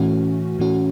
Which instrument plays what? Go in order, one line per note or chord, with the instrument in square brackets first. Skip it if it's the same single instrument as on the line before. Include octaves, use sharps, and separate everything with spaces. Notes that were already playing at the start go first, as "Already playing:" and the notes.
Already playing: [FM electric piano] A2 E3 A3 C#4 F#4
A2 E3 A3 C#4 F#4